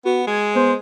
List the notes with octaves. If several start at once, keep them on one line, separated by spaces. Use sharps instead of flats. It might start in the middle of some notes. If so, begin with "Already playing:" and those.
B3 F#4
G#3 G#6
B3 C5